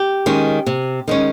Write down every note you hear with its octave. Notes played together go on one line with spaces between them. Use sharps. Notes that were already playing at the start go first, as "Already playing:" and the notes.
Already playing: G4
D#3 G#3 C#4
C3
D#3 G#3 C#4